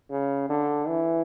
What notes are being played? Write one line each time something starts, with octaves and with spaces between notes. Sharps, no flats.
C#3
D3
E3